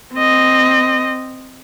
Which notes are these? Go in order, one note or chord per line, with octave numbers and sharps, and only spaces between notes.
C4 D#5